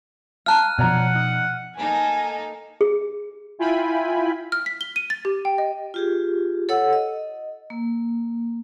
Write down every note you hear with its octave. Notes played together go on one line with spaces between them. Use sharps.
F5 A5 A#5 F6 F#6 D#7
B2 F3 C#5 D5 F#5 A#5
D#4
A#3 D#4 A4 G#5
G#4
E4 F4 G5 G#5 B5
F6
B6
G7
D#7
A6
G4
G5
D#5
F4 G4 G#4
A4 C#5 F#5 E6
D#5
A#3